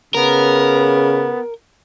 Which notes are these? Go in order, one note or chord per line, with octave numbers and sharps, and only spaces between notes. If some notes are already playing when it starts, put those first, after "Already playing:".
C#3 B3 A#4